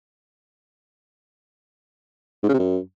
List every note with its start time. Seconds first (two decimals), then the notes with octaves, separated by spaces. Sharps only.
2.43 G#2
2.48 C#3
2.54 C3
2.59 F#2